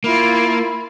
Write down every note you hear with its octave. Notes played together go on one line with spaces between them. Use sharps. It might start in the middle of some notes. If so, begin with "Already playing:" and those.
A#3 E4 F4 B5